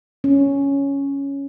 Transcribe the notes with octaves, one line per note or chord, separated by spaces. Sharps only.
C#4